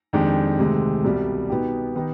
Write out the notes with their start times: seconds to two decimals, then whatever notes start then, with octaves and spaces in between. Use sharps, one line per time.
0.13 F2 D#3 G#3 D4 G4
0.59 D2 C3 D#3 G#3
1.04 C2 B2 G3
1.50 B2 B3 D#4 G4
1.95 D#3 B3 D#4 G4